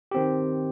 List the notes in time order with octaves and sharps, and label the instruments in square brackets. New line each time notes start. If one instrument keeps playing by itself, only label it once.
[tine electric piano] D#3 C4 G4